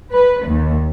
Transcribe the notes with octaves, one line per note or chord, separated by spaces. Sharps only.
B4
D#2